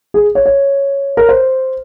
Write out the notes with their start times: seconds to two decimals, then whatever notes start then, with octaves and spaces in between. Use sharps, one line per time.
0.14 G#4
0.35 C#5
0.46 C#5
1.17 A#4
1.29 C5